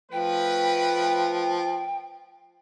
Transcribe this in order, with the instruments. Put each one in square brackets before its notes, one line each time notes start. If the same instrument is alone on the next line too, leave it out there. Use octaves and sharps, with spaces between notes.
[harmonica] F3 [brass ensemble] A3 B4 [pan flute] G5